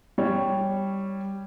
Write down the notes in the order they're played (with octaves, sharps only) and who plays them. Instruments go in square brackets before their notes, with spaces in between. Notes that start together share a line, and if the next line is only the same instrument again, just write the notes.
[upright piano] G3 C#5